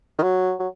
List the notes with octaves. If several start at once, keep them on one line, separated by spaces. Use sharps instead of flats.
D#3
F#3
F#3